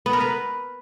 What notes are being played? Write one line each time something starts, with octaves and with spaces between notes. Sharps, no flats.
B3
A#4
B4